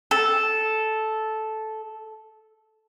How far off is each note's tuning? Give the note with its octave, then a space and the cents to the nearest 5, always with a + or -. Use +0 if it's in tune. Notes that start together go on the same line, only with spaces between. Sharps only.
A4 -10